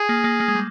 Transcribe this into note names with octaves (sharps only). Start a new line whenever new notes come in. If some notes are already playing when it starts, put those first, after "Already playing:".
Already playing: G#4
A#3
A#3
A#3
G#3
G3